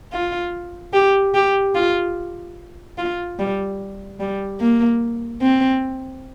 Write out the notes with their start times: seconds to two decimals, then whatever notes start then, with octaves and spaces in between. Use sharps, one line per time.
0.13 F4
0.93 G4
1.34 G4
1.75 F4
2.98 F4
3.39 G3
4.20 G3
4.60 A#3
5.42 C4